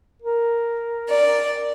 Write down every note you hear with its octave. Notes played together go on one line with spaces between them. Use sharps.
A#4
D5